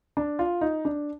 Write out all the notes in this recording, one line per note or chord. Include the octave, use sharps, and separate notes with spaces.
D4
F4
D#4
D4